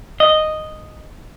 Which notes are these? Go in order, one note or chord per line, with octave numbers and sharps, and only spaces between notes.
D#5